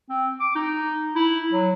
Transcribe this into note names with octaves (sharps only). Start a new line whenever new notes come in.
C4
D6
D#4
E4
F#3